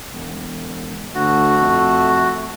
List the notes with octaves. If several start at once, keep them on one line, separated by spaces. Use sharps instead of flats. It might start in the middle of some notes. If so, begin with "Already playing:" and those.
E1
D2 A3 F#4
F2